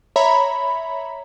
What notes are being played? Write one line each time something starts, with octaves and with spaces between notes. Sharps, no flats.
C#5 E5 A#5 B5